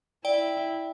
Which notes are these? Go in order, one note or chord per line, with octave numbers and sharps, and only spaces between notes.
E4 D5 G5